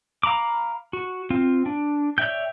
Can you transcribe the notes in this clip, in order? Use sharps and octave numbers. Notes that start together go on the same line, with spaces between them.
F5 A#5 B5 D6
F#4
C4 F4
D4
C#5 D5 E5 G5 G6